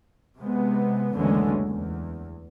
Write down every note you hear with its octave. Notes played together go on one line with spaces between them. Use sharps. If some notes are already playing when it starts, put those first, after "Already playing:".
C3 G#3 B3
F#1 D2 D3 E3 G#3 C#4
E2